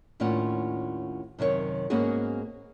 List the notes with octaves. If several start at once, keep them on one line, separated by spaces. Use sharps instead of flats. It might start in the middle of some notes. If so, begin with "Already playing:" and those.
D#2 A2 C#4 D4 F4 F#5
F#2 C3 D#3 C#5
G#2 A#3 B3 C#4 F#4 G#4